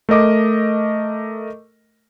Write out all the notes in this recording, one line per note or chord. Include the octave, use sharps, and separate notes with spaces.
A3 A#4 D#5 D6